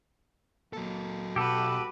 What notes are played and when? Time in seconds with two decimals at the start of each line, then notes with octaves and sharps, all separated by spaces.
0.73 F#3 A#3 A4
1.36 B1 F#4 G4 A4 B4